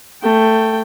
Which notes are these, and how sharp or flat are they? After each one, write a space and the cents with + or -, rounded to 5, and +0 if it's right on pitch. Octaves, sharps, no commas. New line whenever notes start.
A3 +10 G5 +0